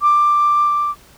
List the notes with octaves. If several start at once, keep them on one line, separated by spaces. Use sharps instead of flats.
D6